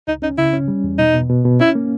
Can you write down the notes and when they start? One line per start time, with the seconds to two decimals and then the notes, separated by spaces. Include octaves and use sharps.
0.08 C#2 D#4
0.22 C#4 D#4
0.38 C#3 E4
0.53 C#4
0.68 G3
0.84 E2
0.98 B2 D#4
1.14 B2
1.29 B2
1.45 B2
1.60 C#4 E4
1.75 A#3